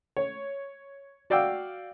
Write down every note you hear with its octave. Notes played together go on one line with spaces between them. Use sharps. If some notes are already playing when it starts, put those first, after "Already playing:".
C#5
F#4 D5 F5 G5 E6